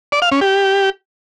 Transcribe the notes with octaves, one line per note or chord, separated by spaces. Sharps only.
D5
F5
C#4
G4